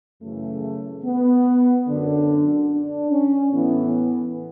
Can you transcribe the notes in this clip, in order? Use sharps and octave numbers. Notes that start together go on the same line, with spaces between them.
F#2 C#3 E3 A3
B3
F#2 D3 D4
D4
C#4
A2 E3 B3